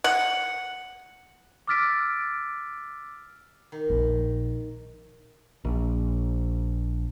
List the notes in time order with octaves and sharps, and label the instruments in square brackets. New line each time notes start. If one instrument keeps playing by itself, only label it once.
[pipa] F#5
[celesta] D6 E6 F6 A6 B6 D7
[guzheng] D#3
[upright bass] A#1
[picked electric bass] A#1